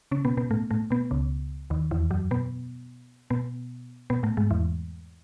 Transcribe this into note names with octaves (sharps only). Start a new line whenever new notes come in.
C#3 C#4
B2 B3
B2 B3
A2 A3
A2 A3
B2 B3
C#2 C#3
D#2 D#3
E2 E3
F#2 F#3
B2 B3
B2 B3
B2 B3
A2 A3
G#2 G#3
E2 E3